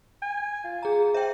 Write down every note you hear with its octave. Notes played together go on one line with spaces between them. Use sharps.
G#5
F4
G#4 A#5
C5 E5 G5